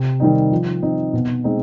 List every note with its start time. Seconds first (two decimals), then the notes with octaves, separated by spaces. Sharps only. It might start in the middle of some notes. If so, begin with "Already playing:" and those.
Already playing: C3
0.20 D#3 G3 C4 D#4
0.51 F3
0.83 C4 D#4
1.13 B2
1.44 G#3 C4 D#4